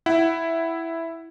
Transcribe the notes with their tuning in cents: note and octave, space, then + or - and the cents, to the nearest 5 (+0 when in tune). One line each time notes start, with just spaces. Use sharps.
E4 +0 F#5 +20